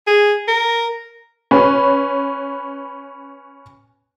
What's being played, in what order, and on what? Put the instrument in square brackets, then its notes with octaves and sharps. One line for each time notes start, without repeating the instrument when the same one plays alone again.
[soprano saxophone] G#4
A#4
[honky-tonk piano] C#4 B4